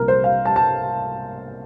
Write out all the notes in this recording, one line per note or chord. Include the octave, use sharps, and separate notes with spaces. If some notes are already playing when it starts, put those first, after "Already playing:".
Already playing: C2 A#2 F3 C4 A#4
C5
F5
A5
A5